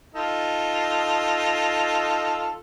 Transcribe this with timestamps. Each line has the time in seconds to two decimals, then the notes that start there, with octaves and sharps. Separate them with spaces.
0.15 D#4 F4 A4